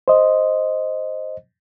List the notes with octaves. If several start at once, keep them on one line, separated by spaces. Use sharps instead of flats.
C5 D#5